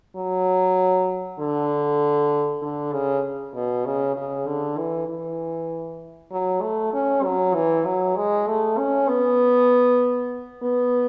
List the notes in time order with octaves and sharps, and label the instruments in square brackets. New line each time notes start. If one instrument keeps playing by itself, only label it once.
[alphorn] F#3
D3
D3
C#3
B2
C#3
C#3
D3
E3
E3
F#3
A3
C#4
F#3
E3
F#3
G#3
A3
C#4
B3
B3